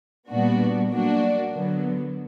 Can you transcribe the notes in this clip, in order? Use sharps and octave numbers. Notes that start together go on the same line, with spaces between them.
A#2 G3 B3 D4 F#4
F#3 A#3 D4 F#4
D3 F#3 B3